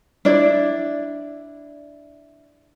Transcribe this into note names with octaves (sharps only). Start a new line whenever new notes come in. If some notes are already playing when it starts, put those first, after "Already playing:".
D4 E4 D5